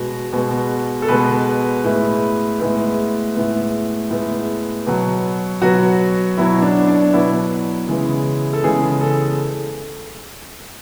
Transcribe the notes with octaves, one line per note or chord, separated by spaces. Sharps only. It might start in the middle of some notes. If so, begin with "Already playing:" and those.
Already playing: B2 G#3 B3 F#4
B2 G#3 B3
A4
B2 G#3 B3 B4
A2 G#3 B3
A2 G#3 B3
A2 G#3 B3
A2 G#3 B3
B2 F#3 B3
B2 F#3 B3 F#4
B2 F#3 B3 E4
D4
D4
B2 F#3 B3 E4
C#3 E3 G#3 B3
A4
C#3 E3 G#3 B3 G#4
A4